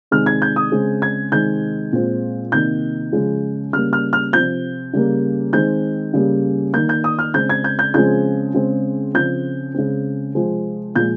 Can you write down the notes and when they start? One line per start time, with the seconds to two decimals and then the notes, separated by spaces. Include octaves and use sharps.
0.11 C3 D#3 G#3 C4 F6
0.26 G#6
0.42 G6
0.56 D#6
0.72 C#3 G#3 C4
1.02 G#6
1.32 C3 D#3 G#3 C4 G6
1.93 A#2 G#3 C4
2.52 C3 D#3 A#3 G6
3.12 C#3 F3 G#3
3.73 C#3 G3 A#3 F6
3.93 F6
4.13 F6
4.33 C3 F3 C4 G6
4.93 C#3 G3 A#3
5.53 D#3 G#3 C4 G6
6.14 C#3 G3 A#3
6.73 D#3 A#3 G6
6.89 G6
7.04 D#6
7.19 F6
7.34 C#3 G#3 C4 G6
7.49 G#6
7.64 G6
7.79 G6
7.94 C#3 F3 G#3 C4 G6
8.54 C#3 G#3 C4
9.14 C#3 F3 C4 G6
9.74 C#3 G#3 C4
10.35 C3 F3 G#3 C4
10.95 A#2 F3 G#3 G6